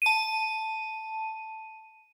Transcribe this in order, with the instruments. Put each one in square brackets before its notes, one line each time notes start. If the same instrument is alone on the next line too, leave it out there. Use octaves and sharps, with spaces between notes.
[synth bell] A5 D#7